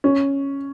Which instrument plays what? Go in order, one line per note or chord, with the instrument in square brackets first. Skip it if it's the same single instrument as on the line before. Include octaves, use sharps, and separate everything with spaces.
[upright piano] C#4